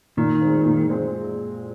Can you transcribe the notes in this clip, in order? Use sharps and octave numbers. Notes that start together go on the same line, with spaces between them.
A#2 D#3
G#3 C4
A#2
G#3 C4